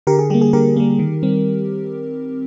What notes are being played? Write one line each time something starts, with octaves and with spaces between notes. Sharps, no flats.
D3 G4 A#4
G#4
G3 A#3 G4
G#4
D3 G4 A#4
G3 A#3
D#3
G3 C4